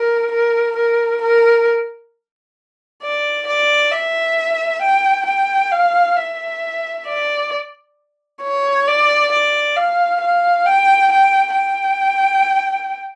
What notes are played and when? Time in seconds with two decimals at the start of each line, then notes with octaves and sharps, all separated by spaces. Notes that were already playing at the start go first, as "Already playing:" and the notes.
Already playing: A#4
0.31 A#4
0.76 A#4
1.21 A#4
3.02 D5
3.47 D5
3.91 E5
4.82 G5
5.26 G5
5.72 F5
6.17 E5
7.06 D5
8.42 C#5
8.87 D5
9.32 D5
9.76 F5
10.21 F5
10.66 G5
11.12 G5
11.56 G5